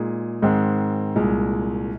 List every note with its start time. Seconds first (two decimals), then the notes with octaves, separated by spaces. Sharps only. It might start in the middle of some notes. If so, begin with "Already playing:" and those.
Already playing: A#2 G#3 D#4 G#4
0.42 G#2 D#3 G#3 C4
1.16 C2 A#2 G#3